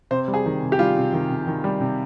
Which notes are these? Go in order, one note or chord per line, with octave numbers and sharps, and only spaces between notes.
C3 C5
G3
G#4
D#3
C3
G4
G3 F4
C3
D#3
C3
D#3
G3
C3